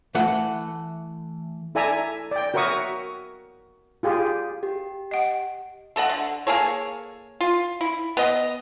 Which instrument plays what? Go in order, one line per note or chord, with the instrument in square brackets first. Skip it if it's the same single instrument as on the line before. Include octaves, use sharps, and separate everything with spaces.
[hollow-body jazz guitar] E3 A3 F#5
[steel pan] E4 A4 D5 E5 G#5 A#5
D5 G5
F#4 A#4 C#5 E5 C#6 D#6
F4 G4 G#4
[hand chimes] G4
[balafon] D#5 F#5
[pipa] A3 A4 D#5 F#5
D3
A#3 G#4 A4 C#5
F4
E4
B3 D#5